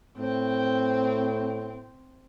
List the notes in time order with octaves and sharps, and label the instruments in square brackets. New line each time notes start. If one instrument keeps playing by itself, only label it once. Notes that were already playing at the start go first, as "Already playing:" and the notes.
[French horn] A2 [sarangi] C4